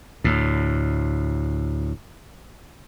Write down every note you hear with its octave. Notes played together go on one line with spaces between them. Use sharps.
D2 A2